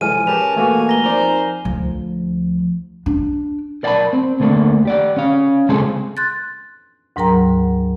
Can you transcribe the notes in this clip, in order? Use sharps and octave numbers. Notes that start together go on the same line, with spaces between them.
A2 C3 E3 F3 G#3 G#5 F6 D#7
C#4 G4 G#4 A#4 B4 A5 F7
B2 E3 A3 A#3 F#4 G#5
A#5 A#6 G7
F3 C4 D#4 A#4 C5 D5 A#5
D2 F3
D4
A#4 D5 F5 G5 A5 B5
C4
D2 A3 A#3 D4
G4 D5 F#5
C#4 F5
C#3 G#3 C4 F4 G#4 A4
C6 F#6 G6 A6
D2 G#2 F#3 A#4 G5 A#5